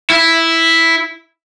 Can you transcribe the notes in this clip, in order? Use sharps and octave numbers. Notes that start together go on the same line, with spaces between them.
E4